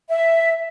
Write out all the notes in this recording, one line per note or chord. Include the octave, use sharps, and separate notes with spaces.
E5